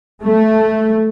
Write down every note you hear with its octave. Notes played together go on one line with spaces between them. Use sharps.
A3